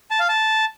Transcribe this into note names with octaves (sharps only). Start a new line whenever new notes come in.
A5
F5
A5